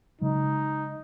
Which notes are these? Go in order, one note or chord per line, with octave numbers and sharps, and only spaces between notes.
C#3 F#3 G#3 D#4